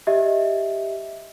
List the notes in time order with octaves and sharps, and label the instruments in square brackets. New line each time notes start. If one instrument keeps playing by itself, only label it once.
[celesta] G4 D#5 E5